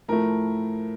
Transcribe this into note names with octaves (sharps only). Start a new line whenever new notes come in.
A2 F3 A3 A#4